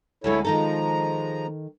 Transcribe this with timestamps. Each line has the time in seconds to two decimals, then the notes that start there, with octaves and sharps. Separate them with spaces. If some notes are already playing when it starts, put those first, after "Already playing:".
0.24 D2 G#3 E4 A4 C#5
0.45 D#3 F3 G#3 D#4 A4 A#5